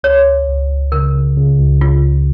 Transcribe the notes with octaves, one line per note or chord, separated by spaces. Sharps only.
C#2 C#5
C#2
C#2
C#2
C#3 A#4
C#3
C#3
C#2
C#3 F4
C#3